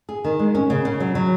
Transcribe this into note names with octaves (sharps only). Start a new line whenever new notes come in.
G#4
D#3
G#3
C#4
C#3
C#3
F#3
F#3